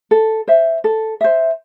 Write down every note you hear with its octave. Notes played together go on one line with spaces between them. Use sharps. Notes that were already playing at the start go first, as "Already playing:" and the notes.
A4
C5 E5
A4
C5 E5